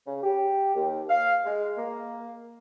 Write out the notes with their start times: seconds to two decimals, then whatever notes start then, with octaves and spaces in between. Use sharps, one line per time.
0.07 C#3
0.23 G4
0.75 D#2
1.10 F5
1.45 G#3
1.77 A#3